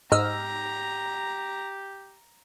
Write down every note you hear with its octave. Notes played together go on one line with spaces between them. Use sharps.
G#2 G4 D#5 A#5 E6 F6